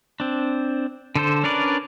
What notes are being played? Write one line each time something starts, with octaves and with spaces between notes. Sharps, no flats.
C4 D4
D3 A4 C5
C#4 D4 A#4 B4 D5